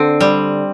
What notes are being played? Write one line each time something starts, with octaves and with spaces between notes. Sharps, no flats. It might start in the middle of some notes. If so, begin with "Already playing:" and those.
Already playing: D3 C4
G3